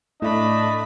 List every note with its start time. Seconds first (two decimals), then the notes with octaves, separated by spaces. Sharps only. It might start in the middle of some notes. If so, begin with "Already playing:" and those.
0.22 A2 A3 D4 D#5 B5